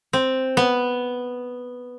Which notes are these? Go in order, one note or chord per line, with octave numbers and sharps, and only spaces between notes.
C4
B3